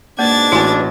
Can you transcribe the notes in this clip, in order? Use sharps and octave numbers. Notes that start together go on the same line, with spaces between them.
G#2 B2 A#3 D4 G#6 A6
A1 E4 F#4 G#5